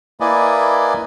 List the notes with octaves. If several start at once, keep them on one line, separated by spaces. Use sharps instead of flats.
A#3 E4 B4 D5 D#5 G#5